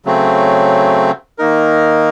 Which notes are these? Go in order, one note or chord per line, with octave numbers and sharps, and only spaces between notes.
C#3 F#3 A3 C4
D#3 A#3 D#4 A#4